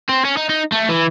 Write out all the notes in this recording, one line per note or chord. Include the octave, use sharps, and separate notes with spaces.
C4
C#4
D#4
D#4
A3
E3